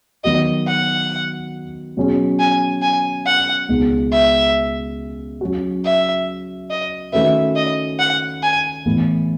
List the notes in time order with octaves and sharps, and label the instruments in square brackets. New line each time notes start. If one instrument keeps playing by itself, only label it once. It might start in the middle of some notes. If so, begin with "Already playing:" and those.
[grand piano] D#3 F#3 B3 F#4 [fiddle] D#5
[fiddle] F#5
[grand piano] B2 F#3 C#4 G#4
[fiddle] G#5
G#5
F#5
[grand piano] C#2 B2 G#3 B3 D#4
[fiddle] E5
[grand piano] F#3 C#4 F#4
[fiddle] E5
D#5
[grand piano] D#3 A3 C#4 F#4 B4 [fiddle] E5
[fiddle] D#5
F#5
G#5
[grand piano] A2 E3 B3 E4